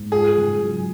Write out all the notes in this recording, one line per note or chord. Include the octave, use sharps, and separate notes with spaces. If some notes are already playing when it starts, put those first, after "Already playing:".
Already playing: G#2
F4 G#4
C#3
F#3